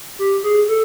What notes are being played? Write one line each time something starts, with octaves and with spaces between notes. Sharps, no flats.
G4
G#4
A4